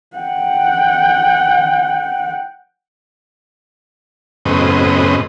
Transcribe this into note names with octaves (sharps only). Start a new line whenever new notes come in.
F#5 G5
F#2 A2 C#3 B3 C4 D#5